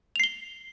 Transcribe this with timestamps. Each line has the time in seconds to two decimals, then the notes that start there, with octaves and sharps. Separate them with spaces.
0.16 F7
0.20 C7
0.24 G7